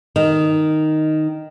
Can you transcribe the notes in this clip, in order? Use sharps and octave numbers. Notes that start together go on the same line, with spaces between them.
D#3